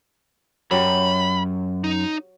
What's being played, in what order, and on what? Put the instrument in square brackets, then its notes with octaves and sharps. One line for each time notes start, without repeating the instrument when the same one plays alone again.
[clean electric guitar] F#2 [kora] F#3 G4 [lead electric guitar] B5
[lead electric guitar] D#4